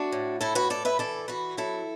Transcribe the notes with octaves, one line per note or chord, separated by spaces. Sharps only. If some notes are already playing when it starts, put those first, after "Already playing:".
Already playing: A3 D4 F#4
A2
A2 E4 A4
F#4 B4
A2 A4 D5
B4 E5
E3 A4 D5
E3 F#4 B4
F#3 E4 A4